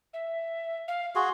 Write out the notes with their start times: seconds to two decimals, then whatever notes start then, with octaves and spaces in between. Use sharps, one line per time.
0.13 E5
0.88 F5
1.15 F#4 G#4 C6